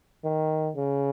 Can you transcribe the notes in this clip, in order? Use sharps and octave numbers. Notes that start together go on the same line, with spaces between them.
D#3
C#3